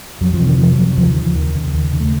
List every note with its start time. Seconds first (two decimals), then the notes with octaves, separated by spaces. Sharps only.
0.21 F2 F#3
0.34 F3
0.40 C3
0.47 D#3
0.59 F2 F3
0.72 F#3
0.78 C3
0.84 F#3
0.97 D#2 F3
1.10 D#3
1.16 C#3
1.22 F3
1.35 D#2 D#3
1.55 C#3
1.73 D#2
1.92 C#3
2.00 A3